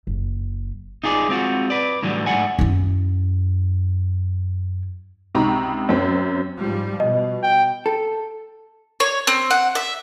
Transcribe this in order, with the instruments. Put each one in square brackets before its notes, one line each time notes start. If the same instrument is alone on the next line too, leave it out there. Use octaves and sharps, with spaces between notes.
[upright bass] F#1
[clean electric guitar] D#4 F4 G#4 C#5 D5
G#3 C4 F4 F#4
B4 D5
A2 D3 E3 F#3 G3
G#2 A3 G4 D5 F#5 G#5
[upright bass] F#2 E4
[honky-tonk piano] C#2 C3 D#4 A#5 B5 C#6
F#2 C4
[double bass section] G#2 F3 G3
[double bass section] B2 [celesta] D#5
[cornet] G5
[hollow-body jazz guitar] A4
[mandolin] C#5
C4
F#5
E5